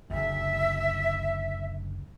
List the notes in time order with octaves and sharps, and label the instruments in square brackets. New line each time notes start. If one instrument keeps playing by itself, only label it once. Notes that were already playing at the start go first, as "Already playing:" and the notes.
[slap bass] F#1 D2 [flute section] E5